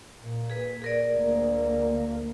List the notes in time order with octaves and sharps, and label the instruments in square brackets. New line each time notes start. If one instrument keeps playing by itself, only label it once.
[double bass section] A#2
[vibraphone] G#4 B4
G#4 A#4 D5
[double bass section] D2 A#3